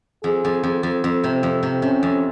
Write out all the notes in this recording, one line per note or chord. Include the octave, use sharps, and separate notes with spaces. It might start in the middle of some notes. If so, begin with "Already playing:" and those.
F2 G#4
F2
F2
F2
F2
C3
F2
C3
C3 C#4
F2